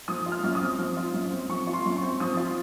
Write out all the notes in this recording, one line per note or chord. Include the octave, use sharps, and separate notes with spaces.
F3 D#6
F4
F6
F#2
D#6
C4
F3
F4
F#2
C4
F3 C#6
F4
C6
F#2
C#6
C4
F3 D#6
F4